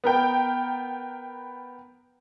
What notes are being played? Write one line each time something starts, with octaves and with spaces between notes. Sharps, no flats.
B3 A#4 G5